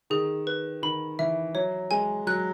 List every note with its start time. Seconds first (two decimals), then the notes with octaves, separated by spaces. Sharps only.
0.10 D#3 G#4
0.47 B4
0.83 D#3 B5
1.19 E3 E5
1.55 F#3 C#5
1.91 G#3 G#5
2.27 F#3 F#6